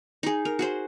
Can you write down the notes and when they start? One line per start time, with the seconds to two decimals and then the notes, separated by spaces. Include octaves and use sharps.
0.23 D#4 G#4
0.45 A#4
0.59 F#4 G#4 C5